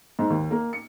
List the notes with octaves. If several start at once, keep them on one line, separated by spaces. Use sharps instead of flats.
G#2
D#2
A#3
C#7